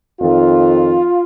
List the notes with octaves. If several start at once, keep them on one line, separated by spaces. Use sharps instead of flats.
F2 D#3 F4